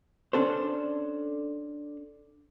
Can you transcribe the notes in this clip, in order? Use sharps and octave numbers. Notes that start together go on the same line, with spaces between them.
C#4 D4 A4 C5